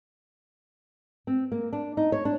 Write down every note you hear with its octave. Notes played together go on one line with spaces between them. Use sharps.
C4
A#3
D4
D#4
C#5
D4